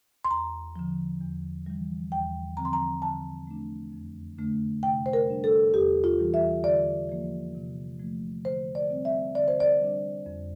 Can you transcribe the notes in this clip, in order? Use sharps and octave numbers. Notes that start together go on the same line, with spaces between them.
C6
E2 A#5
D3 F3
E2
E3 G3
E2 G5
D3 F3 C4 A#5
C6
A#5
D3 A5
A3 D4
F2
D3 A3 D4
C3 G5
C5
A#4
G3 D4
A4
E2 G4
F4
E3 G3
E5
D3 D5
F3 A#3
C3
F3 A3
D3 C5
D5
G3 C4
E5
D3 D5
C5
D5
G3 D4
F2